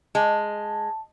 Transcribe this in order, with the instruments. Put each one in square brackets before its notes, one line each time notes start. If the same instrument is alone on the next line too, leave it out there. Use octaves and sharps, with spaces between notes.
[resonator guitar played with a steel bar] G#3 [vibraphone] A5